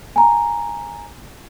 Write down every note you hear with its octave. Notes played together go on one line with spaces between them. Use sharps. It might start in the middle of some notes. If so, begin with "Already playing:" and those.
G#5 A#5